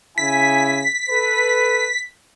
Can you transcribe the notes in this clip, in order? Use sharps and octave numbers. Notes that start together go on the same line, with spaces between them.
C#3 E4 G#5 B6
A4 B4